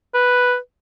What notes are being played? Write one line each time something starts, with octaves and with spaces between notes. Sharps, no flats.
B4